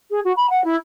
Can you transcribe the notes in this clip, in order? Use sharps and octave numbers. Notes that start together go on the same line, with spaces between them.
G#4
F#4
B5
F#5
E4